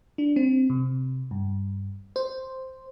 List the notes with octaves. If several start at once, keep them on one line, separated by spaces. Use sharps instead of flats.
D4
C4
C3
G2
C5